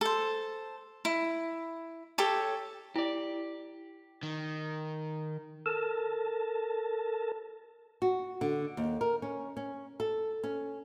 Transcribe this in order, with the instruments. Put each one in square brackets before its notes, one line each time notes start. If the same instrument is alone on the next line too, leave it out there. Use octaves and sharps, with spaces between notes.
[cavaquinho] A4 C5
E4
G4 A4 C#5
[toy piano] E4 [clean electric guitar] G4 D5
[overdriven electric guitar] D#3
[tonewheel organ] A4 A#4 A5
[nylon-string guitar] F#4
D3
D#2
A#4
C#4
C#4
A4
C#4